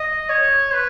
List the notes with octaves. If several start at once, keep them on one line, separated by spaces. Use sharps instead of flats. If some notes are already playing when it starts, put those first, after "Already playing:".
Already playing: D#5
C#5
B4